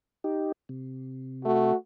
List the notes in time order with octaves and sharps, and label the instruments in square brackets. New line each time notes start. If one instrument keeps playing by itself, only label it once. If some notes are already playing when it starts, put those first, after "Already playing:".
[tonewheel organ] D#4 G4
C3
[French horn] A3 [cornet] F#4